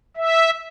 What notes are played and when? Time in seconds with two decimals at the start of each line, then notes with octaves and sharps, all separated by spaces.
0.17 E5